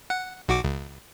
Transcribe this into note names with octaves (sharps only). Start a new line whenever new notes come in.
F#5
B1 F#4 D6
C#2